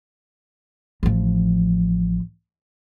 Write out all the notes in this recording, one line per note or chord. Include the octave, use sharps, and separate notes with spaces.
A1 F3